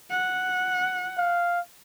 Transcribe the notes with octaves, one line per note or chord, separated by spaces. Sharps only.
F#5
F5